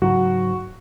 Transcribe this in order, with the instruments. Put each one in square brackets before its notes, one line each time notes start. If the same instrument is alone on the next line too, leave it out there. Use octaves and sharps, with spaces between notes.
[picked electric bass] G#2 C#3 F#3 [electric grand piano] F#4